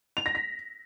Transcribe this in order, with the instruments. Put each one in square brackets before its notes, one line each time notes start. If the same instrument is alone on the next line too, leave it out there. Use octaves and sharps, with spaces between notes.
[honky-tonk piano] F7
A#6
B6